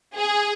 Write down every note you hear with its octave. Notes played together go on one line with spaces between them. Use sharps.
G#4